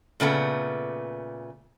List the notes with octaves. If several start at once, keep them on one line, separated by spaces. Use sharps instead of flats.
A#2 C#3 A3 B3